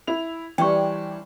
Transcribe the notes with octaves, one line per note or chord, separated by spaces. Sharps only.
E4 F7
E3 G3 C#4 D4 C5 G5 C#6